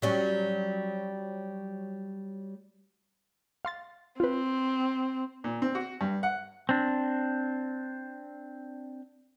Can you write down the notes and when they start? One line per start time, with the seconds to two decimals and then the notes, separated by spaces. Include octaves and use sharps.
0.02 F#3 G3 C#4
3.65 F5 C6 A6
4.20 C4 F4 B4
5.44 A#2
5.62 C4
5.75 F#4
6.01 G2
6.23 F#5
6.69 C4 D4